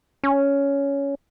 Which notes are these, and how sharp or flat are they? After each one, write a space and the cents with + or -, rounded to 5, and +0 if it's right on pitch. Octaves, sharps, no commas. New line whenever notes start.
C#4 +10